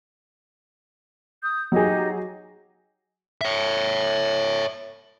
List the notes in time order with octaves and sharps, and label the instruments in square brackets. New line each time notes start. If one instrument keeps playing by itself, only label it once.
[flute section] D#6 G6
[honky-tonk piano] F#3 G#4 [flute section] D#4 G4 D#5
[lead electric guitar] C#5 E5